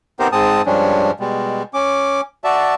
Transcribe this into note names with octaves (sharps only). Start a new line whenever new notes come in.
B3 C4 D#4 G4 A#4 C5
G#2 G#3 C4 A5 D#6
G2 F3 G3 G#3 C#4 D4
B2 G3 G#3
C#4 D6
F#4 D5 E5 A5